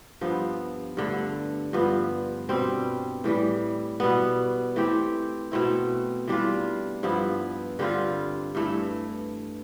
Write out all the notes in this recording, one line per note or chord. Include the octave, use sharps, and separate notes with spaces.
G2 F3 B3
G2 D3 A3
G2 F3 B3
B2 G3 C4
A2 E3 G3
B2 G3 B3
E3 A3 C4 G4
B2 A3 C4 E4
E3 G3 D4 F4
G2 F3 B3 E4
D3 G3 C4 F4
G2 E3 A3 E4